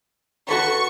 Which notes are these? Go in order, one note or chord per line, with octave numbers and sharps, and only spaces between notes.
F#4 A4 B4 C#6